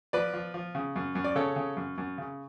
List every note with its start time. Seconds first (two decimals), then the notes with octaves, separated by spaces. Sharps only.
0.13 F3 B4 D5
0.33 F3
0.54 F3
0.75 C#3
0.96 F#2
1.15 F#2
1.24 D5
1.36 C#3 A4 C#5
1.56 C#3
1.77 F#2
1.98 F#2
2.18 C#3